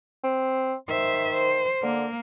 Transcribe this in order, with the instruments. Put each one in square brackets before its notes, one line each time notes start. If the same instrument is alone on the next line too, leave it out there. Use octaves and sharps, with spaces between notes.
[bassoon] C4
[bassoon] D#3 [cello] C5 E5
[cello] C5
[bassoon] D3 [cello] A#3